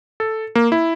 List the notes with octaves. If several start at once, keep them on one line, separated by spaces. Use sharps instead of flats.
A4
A#3
E4